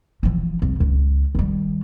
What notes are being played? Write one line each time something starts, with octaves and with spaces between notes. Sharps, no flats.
E3 F3
C2
C#2
D#3 G3